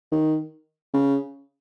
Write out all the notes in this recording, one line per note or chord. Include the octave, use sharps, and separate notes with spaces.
D#3
C#3